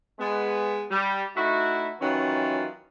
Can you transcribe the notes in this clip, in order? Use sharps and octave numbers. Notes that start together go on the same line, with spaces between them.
G#3 B3
G3
A3 D#4 E4 F#4
D#3 E3 F#3 C#4 F4